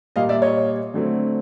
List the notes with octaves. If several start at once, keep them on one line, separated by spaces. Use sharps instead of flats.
A#2 G3 A#3 D#5 F5
D5 E5
C#5 D#5
D3 F#3 A3 C4